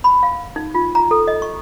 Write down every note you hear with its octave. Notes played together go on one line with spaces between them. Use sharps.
B5
F5
D#4
F4
A#5
A4
D#5
C#6